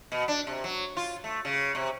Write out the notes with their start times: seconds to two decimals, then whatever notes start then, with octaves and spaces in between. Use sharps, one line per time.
0.12 B2
0.28 D4
0.47 C3
0.64 F#3
0.97 F4
1.24 A3
1.45 C#3
1.75 C3